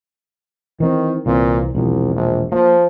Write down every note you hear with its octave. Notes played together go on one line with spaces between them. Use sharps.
D#3 E3 C4
C2 A#2 E3 C4
E1 C2 F3
A#1
F3 A#3